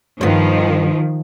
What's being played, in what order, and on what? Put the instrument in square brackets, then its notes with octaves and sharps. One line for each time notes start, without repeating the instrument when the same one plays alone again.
[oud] G2 B3 [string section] D#3 F3